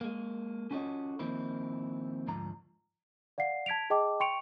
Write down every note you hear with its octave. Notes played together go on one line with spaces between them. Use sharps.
G#3 A#3
C#4 F4 F#4 A4 C#5 D#5
D#3 F3 A#3 C4 D#4 E4
D2 G#2 F3 A#5
D5 F5 F#5 C7
A5 G#6 B6 D7 F7
G#4 D#5 G5 A5 D6
G5 C6 C#6 C#7 D7 F7